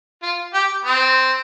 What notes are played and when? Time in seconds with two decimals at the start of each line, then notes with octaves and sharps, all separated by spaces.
0.23 F4
0.54 G4
0.85 C4